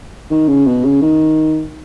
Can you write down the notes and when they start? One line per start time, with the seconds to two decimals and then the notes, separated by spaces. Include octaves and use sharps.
0.31 D#3
0.48 C#3
0.67 B2
0.85 C#3
1.02 D#3